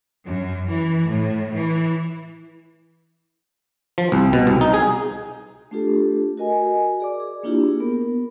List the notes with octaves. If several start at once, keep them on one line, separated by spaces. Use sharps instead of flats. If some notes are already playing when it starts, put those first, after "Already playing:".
F#2
E3
A2
E3
F3
C2
B2
C2
D#4
G#4
A3 D4 F4 G4 A4
F#4 A#4 D#5 G#5
G#4 D5 D6
G#4
A#3 D4 E4 F4 G4 G#4
B3 A#4